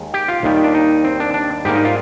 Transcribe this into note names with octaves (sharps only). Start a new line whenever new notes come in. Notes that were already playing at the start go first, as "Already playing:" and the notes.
Already playing: D#2 D#3 G#3
G4
F4
D#2 D#3 G3
D4
D#4
C4
D4
D4
G#2 G3 A#3 G4
D#4
F4